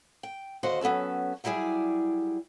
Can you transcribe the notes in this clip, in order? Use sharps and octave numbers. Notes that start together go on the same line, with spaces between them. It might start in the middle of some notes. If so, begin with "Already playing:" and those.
G5
D#2 D3 F#4 C5 D#5 F#5
F#3 B3 C#4 A4 A5
F#3 G3 E4 G#4 D5